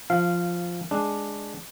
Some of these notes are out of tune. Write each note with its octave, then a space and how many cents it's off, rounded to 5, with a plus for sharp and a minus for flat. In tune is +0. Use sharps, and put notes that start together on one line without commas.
F3 +0 F5 -15
G#3 +0 D4 +0